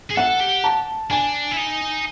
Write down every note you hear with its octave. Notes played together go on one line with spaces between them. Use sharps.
G#4
A4 F#5
G4
A5
D4 G#5
E4
D#4